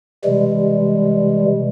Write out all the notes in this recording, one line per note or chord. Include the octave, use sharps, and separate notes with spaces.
C3 E3 G3 G#3